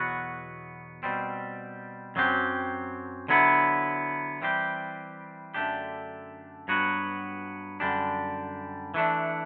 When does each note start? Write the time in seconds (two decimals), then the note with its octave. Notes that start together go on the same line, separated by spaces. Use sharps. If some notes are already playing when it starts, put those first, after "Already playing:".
Already playing: E2 B2 F#3 B3 F#4
1.03 B2 G3 C4
2.16 F#2 F#3 C4 G4
3.28 D3 F#3 B3 E4
4.42 E3 G3 C4 G4
5.54 F#2 D3 A3 D4 G4
6.68 G2 F#3 B3 F#4
7.80 F#2 D3 G3 D4
8.94 E3 A3 D4